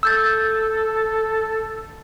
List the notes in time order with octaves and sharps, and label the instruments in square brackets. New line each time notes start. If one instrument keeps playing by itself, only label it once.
[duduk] A4 [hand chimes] E6 G6 A6